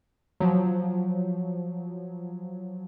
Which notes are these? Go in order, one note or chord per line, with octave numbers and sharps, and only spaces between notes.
F3 F#3